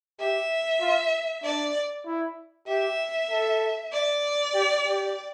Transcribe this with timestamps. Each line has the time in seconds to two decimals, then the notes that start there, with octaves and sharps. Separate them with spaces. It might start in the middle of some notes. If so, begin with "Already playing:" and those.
0.20 G4 E5
0.81 F4
1.44 D4 D5
2.06 E4
2.67 G4 E5
3.30 A4
3.93 D5
4.54 G4
4.86 G4